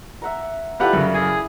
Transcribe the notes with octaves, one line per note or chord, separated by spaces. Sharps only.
E5 F#5 A#5
E4 F4 G4 A4 B4 D5 F#5
F#2 C#3
G#4 E5 G#5